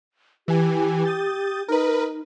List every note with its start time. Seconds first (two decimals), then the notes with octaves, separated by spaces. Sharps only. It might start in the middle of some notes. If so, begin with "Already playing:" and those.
0.48 E3 G4 G#5
1.05 D#6 G6 A6
1.68 D#4 A#4 B4